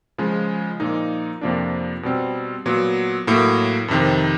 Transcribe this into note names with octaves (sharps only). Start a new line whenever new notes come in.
C#3 F3 G#3
A#2 F3 A#3 D#4
F2 C3 F3 A#3 D4
B2 G3 C4
A#2 F#3 B3
A2 F#3 A#3
F2 C3 D#3